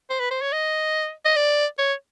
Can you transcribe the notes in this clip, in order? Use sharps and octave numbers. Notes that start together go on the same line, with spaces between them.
C5
B4
C5
C#5
D#5
D#5
D5
C#5